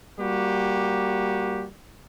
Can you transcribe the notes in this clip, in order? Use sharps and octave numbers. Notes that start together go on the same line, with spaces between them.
G3 A#3 F#4 G4